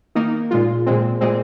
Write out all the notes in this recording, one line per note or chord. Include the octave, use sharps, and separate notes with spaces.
D#3 A#3 D#4 A#4
A#2 G#3 F4
A#2 G#3 C4
A#2 G#3 C4